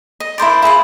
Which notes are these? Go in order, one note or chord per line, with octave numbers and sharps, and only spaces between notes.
D#5
E4 A#4 C5 D5
E4 G#4 B4 F5